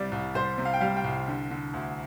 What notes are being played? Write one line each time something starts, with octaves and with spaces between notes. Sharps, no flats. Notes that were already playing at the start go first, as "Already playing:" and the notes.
Already playing: C2 C3 G3 D5
C2
C2 C5
C3
F5
G5
G3 F5
G5
C2
D3
D3
D2